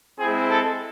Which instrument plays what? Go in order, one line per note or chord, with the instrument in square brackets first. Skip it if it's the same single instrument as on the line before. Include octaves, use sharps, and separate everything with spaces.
[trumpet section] G#3 C4 E4 [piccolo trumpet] G#4
[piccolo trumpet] A4